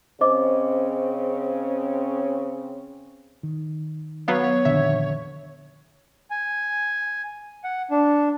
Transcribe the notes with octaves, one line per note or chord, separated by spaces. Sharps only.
C#3 C4 C#4 C5 D#5 D6
D#3
F#3 B3 C#5 F5
F2 A#2 D3 D#3 F3 E5
G#5
F#5
D4